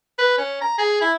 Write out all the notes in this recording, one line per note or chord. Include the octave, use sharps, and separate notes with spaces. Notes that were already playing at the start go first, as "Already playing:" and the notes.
B4
C#4
A#5
G#4
E4